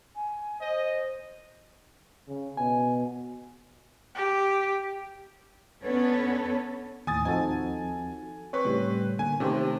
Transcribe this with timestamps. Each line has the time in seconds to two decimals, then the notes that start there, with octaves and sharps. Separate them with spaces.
0.15 G#5
0.61 C5 D#5
2.28 C#3
2.57 B2 G#5
4.15 G4
5.83 B3 C#4 D4 A4 B4 C#5
7.07 D#2 A2 G#5 D#6 A6
7.25 D#2 F3 C4 D#4 F#4 A4 G#5
8.53 C4 B4 C#5 C#6
8.65 A2 C#3 G3 C#5
9.19 D3 A#3 G#5
9.40 C3 D#3 A3 C#4 G4 C5